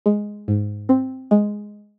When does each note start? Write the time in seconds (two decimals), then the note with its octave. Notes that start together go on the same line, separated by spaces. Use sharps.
0.06 G#3
0.48 G#2
0.89 C4
1.31 G#3